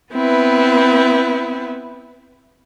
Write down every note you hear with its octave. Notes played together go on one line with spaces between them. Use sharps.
B3 C4 E4 B4